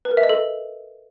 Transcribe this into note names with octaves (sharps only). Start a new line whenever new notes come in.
B4
A#4
E5
D#5
A4